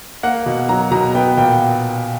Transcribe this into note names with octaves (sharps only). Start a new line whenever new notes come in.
A#3 F#5
B2
F#3 A#5
B2 A#5
B3 G5
A#2 G5